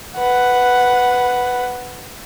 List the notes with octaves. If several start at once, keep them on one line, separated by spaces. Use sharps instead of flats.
B4 F#5